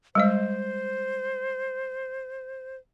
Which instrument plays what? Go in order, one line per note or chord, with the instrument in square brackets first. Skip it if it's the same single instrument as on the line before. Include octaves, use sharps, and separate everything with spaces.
[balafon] G3 G#3 D#5 [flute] C5